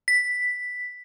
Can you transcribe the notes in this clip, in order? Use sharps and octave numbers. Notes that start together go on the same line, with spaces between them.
B6